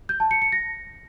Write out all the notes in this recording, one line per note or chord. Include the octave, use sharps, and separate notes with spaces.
G6
A5
C#7
C#7
A#6